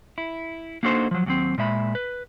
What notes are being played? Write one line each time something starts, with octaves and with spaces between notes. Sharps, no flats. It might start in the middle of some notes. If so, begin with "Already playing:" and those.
E4
A#3 D4 D#4 F#4 A4 C5
F3 F#3
D#2 F#3 C4
A#2 G#3 E5 B5
B4